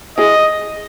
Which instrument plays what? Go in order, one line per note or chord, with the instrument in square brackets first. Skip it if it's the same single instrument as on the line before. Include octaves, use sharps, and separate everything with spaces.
[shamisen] E4 G#4 [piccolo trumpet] D#5